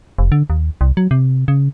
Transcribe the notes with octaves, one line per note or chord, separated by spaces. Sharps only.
F1
D3
D#2
C2
F#3
C3
C#3